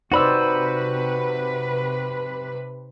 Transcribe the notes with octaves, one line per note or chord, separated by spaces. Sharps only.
C3 D#4 F#4 B4 C5 D5 B5 E6